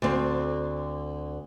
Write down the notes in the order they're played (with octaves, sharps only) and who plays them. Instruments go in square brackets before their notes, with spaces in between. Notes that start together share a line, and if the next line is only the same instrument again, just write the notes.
[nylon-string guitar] D2 C4